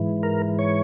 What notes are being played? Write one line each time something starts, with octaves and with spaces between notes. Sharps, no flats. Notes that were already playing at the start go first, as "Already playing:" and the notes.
Already playing: G#2 E3
A#4
C#5